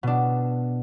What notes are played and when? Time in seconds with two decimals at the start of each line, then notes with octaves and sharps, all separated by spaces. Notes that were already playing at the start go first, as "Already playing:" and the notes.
0.03 B2 D4